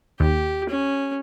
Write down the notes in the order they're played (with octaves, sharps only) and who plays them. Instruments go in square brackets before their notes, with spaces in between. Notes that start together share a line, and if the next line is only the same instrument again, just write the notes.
[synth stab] D#2 [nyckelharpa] G4
[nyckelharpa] C#4